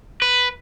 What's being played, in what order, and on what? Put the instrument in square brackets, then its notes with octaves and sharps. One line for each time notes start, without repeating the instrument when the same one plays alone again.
[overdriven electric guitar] B4